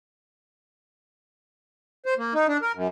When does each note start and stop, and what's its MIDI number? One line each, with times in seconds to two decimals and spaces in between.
2.06 2.14 72
2.18 2.34 58
2.34 2.47 63
2.49 2.57 62
2.62 2.72 70
2.75 2.88 42